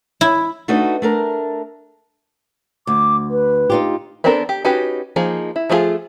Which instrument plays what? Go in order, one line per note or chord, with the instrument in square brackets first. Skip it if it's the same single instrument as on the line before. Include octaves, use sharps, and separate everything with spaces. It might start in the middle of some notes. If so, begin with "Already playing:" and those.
[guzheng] E4
[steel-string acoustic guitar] A3 D4 D#4 F#4 B4 D#5
A3 D4 A#4
[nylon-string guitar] D2 [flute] D6
[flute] B4
[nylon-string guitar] D#4 F4 G4
[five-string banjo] B3 C4 D4 A4 A#4
G4
C#4 D#4 F#4 G4 B4
F3 A#3 D#4 G#4
E4
F3 A3 D4 F4 G#4